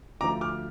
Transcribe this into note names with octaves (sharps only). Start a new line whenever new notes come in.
D2 D3 F3 A#5 D6
D6 F6